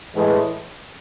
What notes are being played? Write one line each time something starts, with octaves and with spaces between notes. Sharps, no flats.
A2 E3 G#3